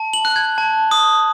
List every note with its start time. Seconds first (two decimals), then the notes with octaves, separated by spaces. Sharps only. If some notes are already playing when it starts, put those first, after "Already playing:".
Already playing: A5
0.13 F#7
0.25 F#6
0.36 G#6
0.58 A5
0.91 D#6